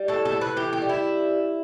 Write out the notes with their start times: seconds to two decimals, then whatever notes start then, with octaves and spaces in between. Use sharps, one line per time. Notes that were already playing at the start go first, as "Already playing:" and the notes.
Already playing: G3
0.08 A2 A4
0.25 A4
0.32 A2
0.41 B4
0.56 E3 G4
0.73 G4
0.82 G3
0.89 E4